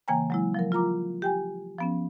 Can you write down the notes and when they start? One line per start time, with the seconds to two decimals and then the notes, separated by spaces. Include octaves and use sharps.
0.08 C#3 E3 A#3 G5 G#5 A#5
0.30 F#3 G#3 E4
0.54 F3 F#3 A#4
0.72 F4 A#4 A#5 D6
1.22 G4 G5 G#5
1.78 F3 B3 C#4